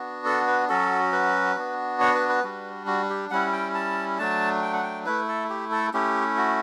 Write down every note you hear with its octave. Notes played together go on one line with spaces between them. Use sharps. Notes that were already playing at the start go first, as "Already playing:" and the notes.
Already playing: B3 D4 F#4
A4
B4
F#3 C#4 F#4 A4
B4
B3 D4 F#4
C#5
B4
B4
G3 D4 F#4
F#4
G4
G3 C#4 E4 F#5
G5
A5
F#3 A3 D4 A5
G5
F#5
G5
A3 E4 B4
A4
G4
A4
A3 C#4 E4 G4
F#4